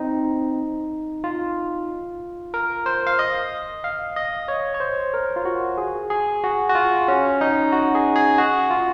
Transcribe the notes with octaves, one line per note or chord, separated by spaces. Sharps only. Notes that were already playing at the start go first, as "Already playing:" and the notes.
Already playing: C4 D#4
F4
A#4
C5
F5
D#5
F5
D#5
C#5
C#5
C5
A#4
F4
F#4
G#4
G#4
F#4
F#4
F4
C#4
D#4
F#4
G#4
G#4
F#4
F4